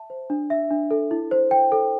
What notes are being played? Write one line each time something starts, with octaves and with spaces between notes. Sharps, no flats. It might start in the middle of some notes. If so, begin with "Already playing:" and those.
Already playing: E5 A5
C5
D4
E5
D4
A4
E4
C5
G5
A4